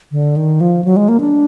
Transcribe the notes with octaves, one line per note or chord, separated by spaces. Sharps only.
D3
D#3
F3
F#3
G#3
A#3
D4